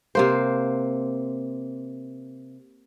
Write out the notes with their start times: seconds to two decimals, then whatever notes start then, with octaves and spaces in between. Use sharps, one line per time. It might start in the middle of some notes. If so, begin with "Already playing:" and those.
0.15 C3 A#3 C5